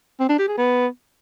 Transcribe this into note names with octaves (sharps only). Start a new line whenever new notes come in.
C4
D4
G4
G#4
B3